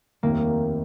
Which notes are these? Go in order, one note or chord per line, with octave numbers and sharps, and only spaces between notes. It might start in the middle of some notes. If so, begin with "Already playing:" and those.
F1 D#2 D#3 A#3